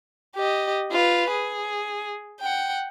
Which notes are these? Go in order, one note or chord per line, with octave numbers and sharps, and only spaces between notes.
G4 D#5
F4 B4
G#4
F#5 G5